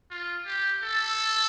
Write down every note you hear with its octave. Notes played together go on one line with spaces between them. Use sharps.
F4
G4
A4